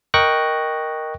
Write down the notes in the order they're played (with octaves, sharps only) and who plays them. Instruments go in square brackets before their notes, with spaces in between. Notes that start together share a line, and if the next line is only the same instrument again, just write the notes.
[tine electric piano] A#4 D#5 G5 C#6 F#6 A#6